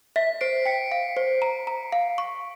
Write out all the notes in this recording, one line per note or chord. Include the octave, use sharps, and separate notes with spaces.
E5 B6
C5 C7 D7
G5 B6 C#7
F5
C5
A#5
A#5
F5
C#6